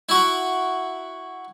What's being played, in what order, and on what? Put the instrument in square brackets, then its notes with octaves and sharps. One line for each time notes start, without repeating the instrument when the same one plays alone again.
[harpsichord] E4 F#4